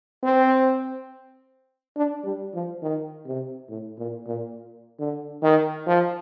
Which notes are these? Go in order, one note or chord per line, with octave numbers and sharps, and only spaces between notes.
C4
D4
G3
F3
D#3
C3
A2
A#2
A#2
D3
D#3
F3